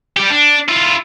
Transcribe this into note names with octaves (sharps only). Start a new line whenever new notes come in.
G3 G4
D4
E4 F4